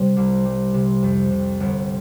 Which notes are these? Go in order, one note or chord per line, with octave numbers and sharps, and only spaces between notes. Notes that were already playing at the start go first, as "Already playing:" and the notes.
Already playing: C3 G3
C2
G3
C3
F2
C3
G1